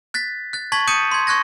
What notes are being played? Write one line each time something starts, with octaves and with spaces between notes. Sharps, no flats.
F#6 A6 B6
F#6 A6
A5 C#6 G#6 A6 B6 F#7
D#6 G6 A6 C#7 D#7 E7
C6 G#6
C#6 F#6 G#6 A#6